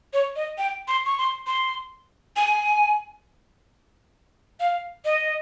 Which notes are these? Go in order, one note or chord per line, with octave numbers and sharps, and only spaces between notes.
C#5
D#5
G5
C6
C#6
C6
C6
G#5
F5
D#5